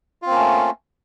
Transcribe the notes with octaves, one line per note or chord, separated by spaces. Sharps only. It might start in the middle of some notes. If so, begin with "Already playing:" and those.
A3 A#3 C4 C#4 F4